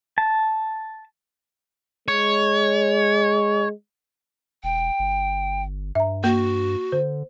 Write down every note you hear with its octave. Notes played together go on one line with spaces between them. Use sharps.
A5
G#3 C#5
E1 G5
G1
G2 E5 A#5
A#3 F#4
D3 C5